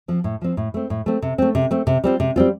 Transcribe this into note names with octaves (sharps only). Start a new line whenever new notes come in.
F3 C4
A2
F3 C4
A2
A3 C4
A2
A3 C4
C3
A3 C4
C3
A3 C4
C3
G3 C4 F4
C3
G3 C4 F4